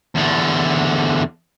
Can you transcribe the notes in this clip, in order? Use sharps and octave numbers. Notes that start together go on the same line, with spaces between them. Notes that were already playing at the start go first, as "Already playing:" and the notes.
E2 D3